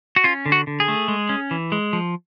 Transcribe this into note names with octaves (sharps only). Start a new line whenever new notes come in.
F#4
C#4 F4
D3
F#4
D3
G#4
A3
G#3
C#4
E3
G#3
F3